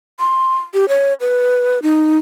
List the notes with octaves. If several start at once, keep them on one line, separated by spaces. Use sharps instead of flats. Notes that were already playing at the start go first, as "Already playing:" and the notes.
C6
G4
C#5
B4
D#4